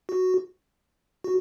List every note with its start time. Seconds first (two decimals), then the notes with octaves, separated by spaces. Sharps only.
0.09 F#4
1.24 F#4